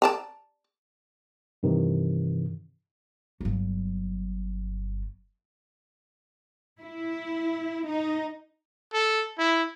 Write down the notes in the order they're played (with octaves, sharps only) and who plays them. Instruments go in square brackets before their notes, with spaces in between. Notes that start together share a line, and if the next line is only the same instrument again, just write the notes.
[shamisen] D5 A5 A#5
[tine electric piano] G2 C3 D#3 E3
[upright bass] G1 F#3
[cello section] E4
D#4
[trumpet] A4
E4